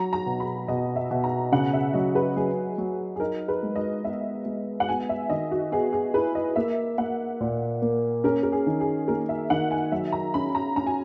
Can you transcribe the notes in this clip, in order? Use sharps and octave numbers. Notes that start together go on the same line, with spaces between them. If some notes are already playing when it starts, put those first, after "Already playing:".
Already playing: F#3 A#5
A#5
B2
B5
B2 D#5
E5
B2
A#5
C#3 F#5
E5
F#3 D#5
B4
F#3 G#4
F#3
G#4
D#4 A#4
B4
G#3
D#5
B3 E5
G#3
F#5
B3 G#5
E5
D#3 D#5
F#4
B3 G#4
G#4
E4 B4
D#5
A#3 E5
A#3 F#5
A#2
A#3
C#4 A#4
A#4
G#4
D#3
G#4
A#3 A#4
E5
D#3 F#5
G#5
F#3 E5
A#5
C#4 B5
A#5
C#4 A#5
G#5